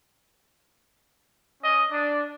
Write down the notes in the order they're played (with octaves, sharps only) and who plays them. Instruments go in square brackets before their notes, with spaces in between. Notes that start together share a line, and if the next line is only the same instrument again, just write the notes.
[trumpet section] C#4 D#5
D4